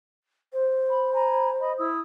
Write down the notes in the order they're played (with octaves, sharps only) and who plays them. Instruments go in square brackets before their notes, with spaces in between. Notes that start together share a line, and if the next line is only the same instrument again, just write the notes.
[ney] C5
[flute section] B5
G#5 A#5 B5
D#5 B5
E4 D#6 E6